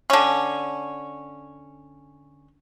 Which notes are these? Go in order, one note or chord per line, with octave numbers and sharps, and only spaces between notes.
D3 C#4